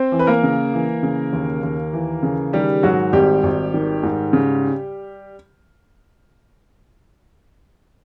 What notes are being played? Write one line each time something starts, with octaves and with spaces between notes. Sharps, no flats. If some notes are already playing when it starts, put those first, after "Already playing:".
Already playing: C4 C5
E3
B4
A#3 A#4
C#3
E3
C#3
D#2
D#2
E3
C#3
D#3 G3 G4
G#2 F#3 F#4
G#1 G3 G4
G#1
D#3
G#2
C#3